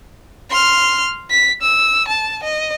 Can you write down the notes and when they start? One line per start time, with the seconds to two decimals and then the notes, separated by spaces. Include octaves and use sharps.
0.50 C6 F6
1.31 B6
1.62 E6
2.08 A5
2.44 D#5